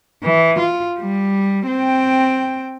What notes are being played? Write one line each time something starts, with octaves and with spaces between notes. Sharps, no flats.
E3
F4
G3
C4 G5